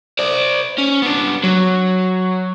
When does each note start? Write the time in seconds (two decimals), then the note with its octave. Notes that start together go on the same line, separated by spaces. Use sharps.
0.19 C5 D5
0.78 C#4
1.02 B3 D4
1.44 F#3